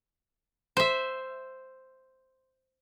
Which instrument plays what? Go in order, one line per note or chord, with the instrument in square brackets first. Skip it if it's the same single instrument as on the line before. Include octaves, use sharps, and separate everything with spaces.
[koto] C5 E5